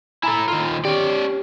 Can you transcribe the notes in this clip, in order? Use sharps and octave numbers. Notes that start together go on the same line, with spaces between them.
E4 A4 G#5 A#5 B5
D#3 F4
C#4 G4 D5